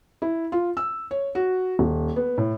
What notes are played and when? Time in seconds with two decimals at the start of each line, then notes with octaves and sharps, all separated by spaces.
0.22 E4
0.52 F4
0.77 E6
1.11 C#5
1.35 F#4
1.79 D#1
2.16 B3
2.38 A2